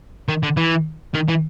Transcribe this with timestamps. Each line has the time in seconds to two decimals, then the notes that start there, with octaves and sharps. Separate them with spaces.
0.29 D#3
0.43 D3
0.57 E3
1.14 D#3
1.28 E3